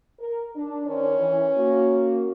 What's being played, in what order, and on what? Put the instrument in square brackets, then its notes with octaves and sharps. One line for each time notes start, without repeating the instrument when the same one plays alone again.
[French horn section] A#4
D4
[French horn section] D#3 A#4 C5 [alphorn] C#4
[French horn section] E3
A#3 F#4